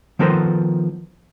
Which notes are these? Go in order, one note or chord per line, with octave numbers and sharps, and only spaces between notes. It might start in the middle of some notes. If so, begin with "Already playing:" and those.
D#3 F3 B3 A4 A#4 C5